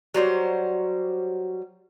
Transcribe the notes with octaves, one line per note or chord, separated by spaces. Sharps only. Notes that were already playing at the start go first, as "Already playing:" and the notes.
F#3 G3 C5 C#5